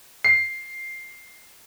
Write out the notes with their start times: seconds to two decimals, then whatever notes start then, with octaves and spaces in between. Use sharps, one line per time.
0.25 C7